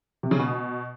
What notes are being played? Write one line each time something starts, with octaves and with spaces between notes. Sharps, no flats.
C3
C#3
B2